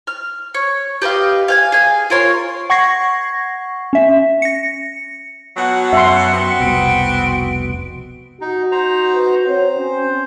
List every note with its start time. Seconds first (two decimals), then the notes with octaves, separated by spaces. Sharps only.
0.07 F6
0.54 C#5
1.02 G4 B4 D#5 F5
1.48 F5 G5 G#5
1.72 G#4 G#5
2.10 F4 A#4 C#5 C6
2.70 F#5 C#6 G#6 A#6 C7
3.93 C#4 E5
4.42 A#6 C#7
5.57 B2 F#3 F#5
5.93 F#2 E5 C6 C#7
6.32 B3 C4 F#4
6.61 F1 C2 B2 D7
8.41 D#4 F#4
8.72 D#4 C5 A#5
9.14 B4
9.47 C4 C5 C#5
9.77 C#4